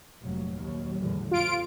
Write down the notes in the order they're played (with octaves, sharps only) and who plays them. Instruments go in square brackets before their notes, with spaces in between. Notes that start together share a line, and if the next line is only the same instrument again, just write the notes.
[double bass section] F1 A#2 F#3
A#1 D#2 F#3
E2 A2 D3
[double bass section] F2 [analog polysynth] F4 D7